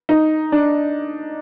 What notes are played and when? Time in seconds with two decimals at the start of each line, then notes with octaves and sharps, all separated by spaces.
0.09 D#4
0.52 D4